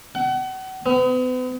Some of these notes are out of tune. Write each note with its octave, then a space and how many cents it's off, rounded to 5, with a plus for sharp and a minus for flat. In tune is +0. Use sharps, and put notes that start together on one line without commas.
F#5 +35
B3 +40